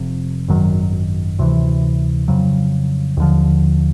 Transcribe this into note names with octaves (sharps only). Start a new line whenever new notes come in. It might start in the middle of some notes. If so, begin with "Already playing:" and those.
Already playing: F1 F2 C3
G#1 F#2 D#3 F#3
D2 C3 E3
F2 C#3 F#3
D#2 D3 F3